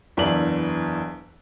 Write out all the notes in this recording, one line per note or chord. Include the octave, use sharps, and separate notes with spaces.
F#1 E2 E3 D4 F#7